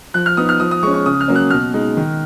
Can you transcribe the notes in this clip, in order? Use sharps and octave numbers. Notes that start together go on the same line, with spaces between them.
F3 F#6
F6
B3 D#4 D#6
F6
F3 D#6
D#6
G#3 C#4 C#6
C#6
C#3 D#6
F6
F#3 A#3 C#4
F#6
B2 F6
G#3 D#4
D#3